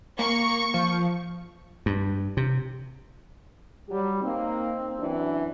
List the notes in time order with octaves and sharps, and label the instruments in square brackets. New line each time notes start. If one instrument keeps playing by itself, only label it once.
[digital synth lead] A#3 [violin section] C#6
[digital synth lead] F3
[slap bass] G2
C3
[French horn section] F#3 G4 [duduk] G3
[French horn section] A#3 D#4 [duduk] C4
[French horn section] F#2 E3 D4